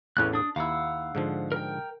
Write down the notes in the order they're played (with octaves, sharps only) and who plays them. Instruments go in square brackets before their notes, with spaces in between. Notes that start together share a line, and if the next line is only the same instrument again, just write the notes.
[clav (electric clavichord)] A1 E2 A2 [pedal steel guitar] E3 C#4 F#6
[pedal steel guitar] D4 D#6
[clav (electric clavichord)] D#2 E4 [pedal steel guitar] F5 F#5 E6
[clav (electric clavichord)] G#2 D3 F3
[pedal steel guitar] A#4 G5